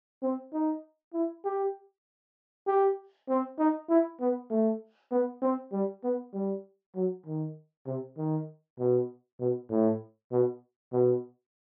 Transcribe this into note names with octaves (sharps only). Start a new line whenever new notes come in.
C4
D#4
E4
G4
G4
C4
D#4
E4
B3
A3
B3
C4
G3
B3
G3
F#3
D#3
C3
D#3
B2
B2
A2
B2
B2